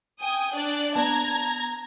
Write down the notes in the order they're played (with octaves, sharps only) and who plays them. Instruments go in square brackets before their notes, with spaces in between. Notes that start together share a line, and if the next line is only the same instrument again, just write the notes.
[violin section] G5 G#5 D#6
D4 D5 F#6
[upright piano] B3 A5 [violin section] A#5 G#6